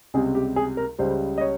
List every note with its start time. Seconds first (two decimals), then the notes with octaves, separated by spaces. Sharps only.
0.14 C#2 C3 G3 G#4
0.35 G4
0.56 G#4
0.77 A#4
0.98 C#2 C#3 G3 C5
1.38 D#5
1.41 C#5